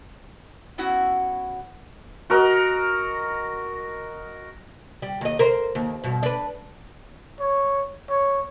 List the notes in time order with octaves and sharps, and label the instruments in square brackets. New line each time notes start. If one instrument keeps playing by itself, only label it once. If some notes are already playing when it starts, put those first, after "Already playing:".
[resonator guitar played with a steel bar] B3 C#4 E4 F#4 F#5
[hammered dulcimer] F#4 A#4 D#5
[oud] G3
D#2 D#5
A#4 C5
D#2
G2 B2
D4 B4
[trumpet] C#5
C#5